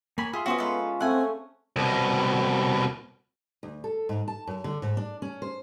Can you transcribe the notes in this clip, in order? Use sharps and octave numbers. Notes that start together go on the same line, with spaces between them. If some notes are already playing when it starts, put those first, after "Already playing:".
A#3 C#5 G#5 B5
F4 G#4 E5 C6
B3 C#4 F#4 C5 F5 D#6
G#3 A4 B4 A#5
A3 C4 A4 F#5 G#5
C2 B2
D2
A4
G#2
A5
F#2
D3
G#2
D4
C#4
C5